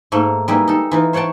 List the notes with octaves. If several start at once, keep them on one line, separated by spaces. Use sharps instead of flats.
G#2 A3 A#3
G3 G#3 A#3 B3 D#4 E4
D#4 A4
E3 D#4 F4
C5 C#5 F#5 G5 A5